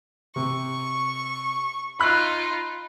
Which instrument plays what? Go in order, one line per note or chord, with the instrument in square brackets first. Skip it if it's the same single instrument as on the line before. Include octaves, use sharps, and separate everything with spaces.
[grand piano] C3 [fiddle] C#6
[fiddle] D#4 F4 [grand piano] B5 F#6